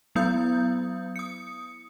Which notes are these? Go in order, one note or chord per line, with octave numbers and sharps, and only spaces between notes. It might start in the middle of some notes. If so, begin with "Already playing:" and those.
F#3 B3 E4 D#6 G6
D#6 C#7